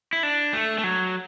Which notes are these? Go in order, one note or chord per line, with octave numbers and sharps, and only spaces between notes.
E4
D4
A3
A3
F#3